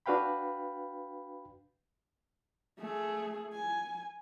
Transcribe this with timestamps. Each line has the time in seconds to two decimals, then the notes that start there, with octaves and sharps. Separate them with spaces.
0.06 D4 F#4 B4 F5 G5 B5
2.79 A3 G#4
3.53 G#5